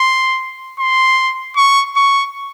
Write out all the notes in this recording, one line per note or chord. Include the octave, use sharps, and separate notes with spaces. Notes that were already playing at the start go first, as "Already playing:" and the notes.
Already playing: C6
C6
C#6
C#6